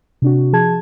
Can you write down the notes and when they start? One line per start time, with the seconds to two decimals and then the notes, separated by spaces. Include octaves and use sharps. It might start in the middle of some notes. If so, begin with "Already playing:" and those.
0.22 C3 D4 F#4
0.53 F3 G#4 A5 G#6